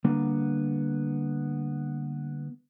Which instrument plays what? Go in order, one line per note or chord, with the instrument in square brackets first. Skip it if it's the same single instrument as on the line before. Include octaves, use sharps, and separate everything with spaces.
[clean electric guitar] D3 G3 A#3 B3 D4